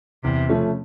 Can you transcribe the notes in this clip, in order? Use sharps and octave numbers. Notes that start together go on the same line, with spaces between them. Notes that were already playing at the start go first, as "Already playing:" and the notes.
E2 C3
C#3 F3 A3 C#4